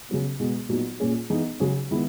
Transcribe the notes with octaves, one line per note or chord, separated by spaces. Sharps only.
C#3 F#3 B3
B2 G#3 B3
A#2 F#3 B3 D#4 F#4
A#2 A#3 C#4 G#4
E3 B3 D#4 G#4
C#3 F#3 C#4 G#4
D#3 G#3 B3 E4